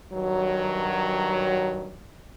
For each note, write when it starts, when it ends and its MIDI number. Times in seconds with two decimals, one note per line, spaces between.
0.13 1.97 43
0.13 1.97 51
0.13 1.97 54